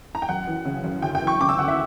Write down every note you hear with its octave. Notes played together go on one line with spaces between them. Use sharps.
A#5
G5
F#2 F#5
E3
C#3
F#2
D2 G5
G5
E3
C#6
C#3 D6
E6
D2 F#5
E5